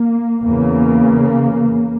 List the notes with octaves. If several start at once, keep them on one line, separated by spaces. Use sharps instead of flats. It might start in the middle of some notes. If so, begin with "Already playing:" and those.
Already playing: A#3
E2 C#3 A#3